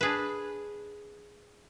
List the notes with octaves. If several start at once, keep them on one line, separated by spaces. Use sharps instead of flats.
D4 G#4 B4